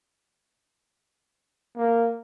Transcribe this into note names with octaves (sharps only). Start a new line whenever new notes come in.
A#3